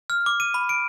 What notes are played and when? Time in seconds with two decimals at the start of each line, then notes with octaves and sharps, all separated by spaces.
0.10 F6
0.26 D6
0.40 D#7
0.54 B5
0.69 D7